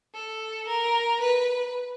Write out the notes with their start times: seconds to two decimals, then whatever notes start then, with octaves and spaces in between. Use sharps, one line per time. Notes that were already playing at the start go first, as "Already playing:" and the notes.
0.15 A4
0.68 A#4
1.21 B4